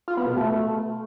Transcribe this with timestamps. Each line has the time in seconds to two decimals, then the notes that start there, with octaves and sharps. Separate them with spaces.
0.08 F4
0.17 B3
0.27 B2
0.37 A3